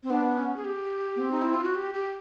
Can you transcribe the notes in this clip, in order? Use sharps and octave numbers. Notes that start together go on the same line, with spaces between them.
C4
B3 D4
C#4
G#4
G4
B3
C4
D#4
E4
F4
F#4
G4
G4